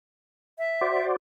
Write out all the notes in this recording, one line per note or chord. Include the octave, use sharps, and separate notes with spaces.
E5
F#4 C5 D5